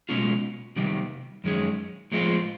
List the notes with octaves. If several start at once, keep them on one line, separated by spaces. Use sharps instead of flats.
B2 G#3 C#4 F4
C3 D#3 G3
F#2 D#3 G#3 C#4
A2 F3 G#3 C4 F4